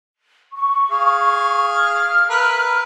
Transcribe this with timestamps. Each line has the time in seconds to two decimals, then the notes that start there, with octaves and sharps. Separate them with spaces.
0.53 C#6
0.91 G#4 F5
1.75 F6
2.30 A#4 B4 E5